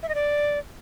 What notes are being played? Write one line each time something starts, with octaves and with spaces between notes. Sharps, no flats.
E5
D#5
D5